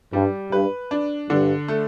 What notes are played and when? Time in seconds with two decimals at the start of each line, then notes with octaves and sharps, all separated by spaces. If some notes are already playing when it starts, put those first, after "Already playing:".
0.13 G2 G3
0.52 G2 B4
0.91 D4
1.30 G2 D3
1.68 A3